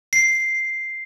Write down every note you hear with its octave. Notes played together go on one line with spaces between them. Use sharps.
C7